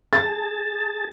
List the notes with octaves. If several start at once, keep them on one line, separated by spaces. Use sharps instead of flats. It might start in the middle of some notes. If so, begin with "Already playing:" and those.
G#4 A5 A6